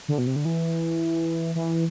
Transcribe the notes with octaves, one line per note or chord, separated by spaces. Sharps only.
D3
B2
C3
D3
E3
E3